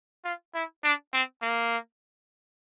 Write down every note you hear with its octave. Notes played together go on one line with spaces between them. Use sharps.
F4
E4
D4
C4
A#3